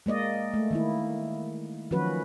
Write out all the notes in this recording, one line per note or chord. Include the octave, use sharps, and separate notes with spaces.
G#3 A#3 D5 D#5
A3
D#3 A#3 E4
D#3 F3 F#3 C#4 F#4 B4